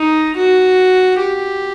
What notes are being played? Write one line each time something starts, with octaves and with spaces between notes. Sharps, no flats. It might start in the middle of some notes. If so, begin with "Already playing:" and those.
Already playing: D#4
F#4
G4